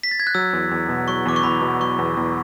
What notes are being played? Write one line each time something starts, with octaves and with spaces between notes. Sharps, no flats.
B6
A6
G#6
F#6
F#3 E6
E2
E2
B2
F#3 C#6
E2 D6
C#6
E2 B5
B2
F#3 C#6
E2
E2